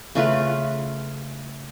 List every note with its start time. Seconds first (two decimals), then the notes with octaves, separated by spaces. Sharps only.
0.15 C#3 A3 F4 B4